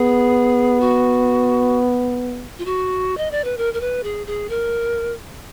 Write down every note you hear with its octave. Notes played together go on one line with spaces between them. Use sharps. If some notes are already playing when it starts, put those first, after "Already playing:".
Already playing: B3 G#4
F#4
F4
F#4
D#5
D5
B4
A#4
A#4
B4
G#4
G#4
A#4